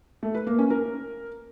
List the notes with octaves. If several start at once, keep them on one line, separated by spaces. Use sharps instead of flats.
A3
B4
A#3
C#4
A#4